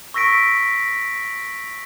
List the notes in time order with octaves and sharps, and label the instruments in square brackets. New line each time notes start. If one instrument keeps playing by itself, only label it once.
[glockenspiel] C#6 E6 A#6 B6 D7